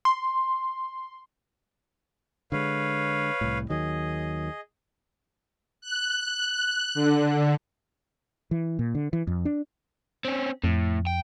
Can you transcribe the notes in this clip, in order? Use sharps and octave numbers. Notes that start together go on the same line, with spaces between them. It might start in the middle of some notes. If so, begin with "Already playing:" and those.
C6
D3 G#3 B4 C#5 F5
C2 A2
D#2 D#3 F#3 G#4 D#5
F#6
D3
E3
A#2
D3
E3
F2
D4
C4 C#4
F2 A2
G5